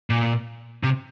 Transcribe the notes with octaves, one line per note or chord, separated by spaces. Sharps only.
A#2
C3